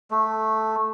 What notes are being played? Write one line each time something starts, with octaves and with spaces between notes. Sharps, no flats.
A3